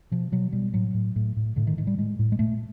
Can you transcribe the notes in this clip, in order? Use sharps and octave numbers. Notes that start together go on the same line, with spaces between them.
B2 F3
B2 F#3
B2 G3
A2 F#3
A2
A2
A2
A2 D3
D#3
A2 D#3
G3
A2 G#3
A2
G#3
A#2 A3